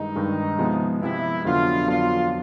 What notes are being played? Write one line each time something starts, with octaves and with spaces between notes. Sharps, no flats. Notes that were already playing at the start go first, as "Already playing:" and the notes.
Already playing: G2 D#3 G#3 D#4
G2 D#3 G#3
C3 F3 G#3 B3
C3 F3 G#3 B3 E4
F2 D3 F#3 B3 D4 F4
F2 D3 F#3 B3 D4 F4